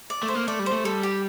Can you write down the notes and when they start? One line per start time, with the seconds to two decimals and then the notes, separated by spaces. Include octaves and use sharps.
0.10 D5
0.23 A3
0.28 C5
0.35 A#3
0.48 A3 D5
0.59 G3
0.66 C5
0.72 A3
0.84 G3 A4
1.03 G4